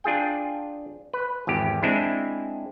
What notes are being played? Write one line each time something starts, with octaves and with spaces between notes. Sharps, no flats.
D4 F4 G#4 G5
B4
G#1 E2 G4
G#3 C4 D4 E4